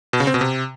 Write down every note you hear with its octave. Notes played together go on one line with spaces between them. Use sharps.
B2
C#3
C4
B2
C3